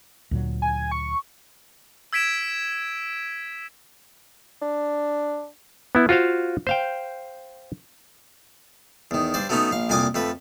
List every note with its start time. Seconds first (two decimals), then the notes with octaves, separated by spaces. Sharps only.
0.31 D2 A#2 F#3
0.62 G#5
0.91 C#6
2.13 E6 G#6 B6 D7 E7
4.62 D4
5.95 B3 E4
6.09 F4 F#4 C5 F5
6.67 C5 F5 G5
9.11 E2 D#3
9.34 G2 C5 D5
9.49 F#3 A3 B3 C#4 D#4
9.71 A#1 F5
9.89 C2 F2 A#2 G#5 D6 D#6
10.15 F2 A3 B4